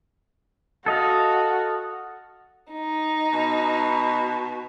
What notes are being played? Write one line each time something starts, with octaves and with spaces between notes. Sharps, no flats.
F#4 A4 D#5 F5
D#4
B2